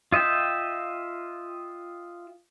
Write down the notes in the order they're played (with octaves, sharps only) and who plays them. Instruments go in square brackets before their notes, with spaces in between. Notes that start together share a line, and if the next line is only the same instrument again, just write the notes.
[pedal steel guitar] F4 D#5 E5 G5